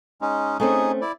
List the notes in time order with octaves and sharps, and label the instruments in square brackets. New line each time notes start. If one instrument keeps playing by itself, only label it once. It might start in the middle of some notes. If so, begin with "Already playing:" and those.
[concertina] G#3 C#4 D#4
[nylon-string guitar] A3 C4 C#4 [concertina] D#4 G#4
[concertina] E4 D5